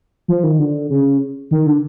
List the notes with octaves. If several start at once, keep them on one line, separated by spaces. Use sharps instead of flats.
F3
D#3
D3
C#3
D#3
D3